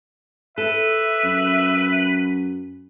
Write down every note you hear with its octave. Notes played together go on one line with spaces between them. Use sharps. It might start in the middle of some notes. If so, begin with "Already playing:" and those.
A4 B4 E5
F#2